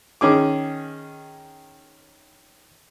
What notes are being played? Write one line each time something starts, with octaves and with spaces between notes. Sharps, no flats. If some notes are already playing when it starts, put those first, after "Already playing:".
D#3 C#4 G#4 D6